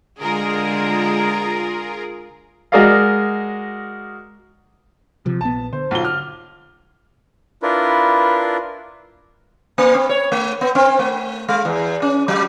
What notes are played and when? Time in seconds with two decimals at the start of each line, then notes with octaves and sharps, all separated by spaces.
0.21 D3 G#3 F4 G#4 A#4
2.72 G#3 F#4 A#4 D5 D#5 F5
5.26 C3 F3
5.41 A#1 B3 A5
5.73 D3 C5
5.91 B1 F4 G7
6.03 D6 F6
7.63 D4 E4 F4 A#4 B4
9.78 A#3
9.95 C4
10.09 C#5
10.32 A3
10.61 B3
10.75 C4
10.99 A3
11.48 G#3
11.65 E2
12.02 C#4
12.28 F#3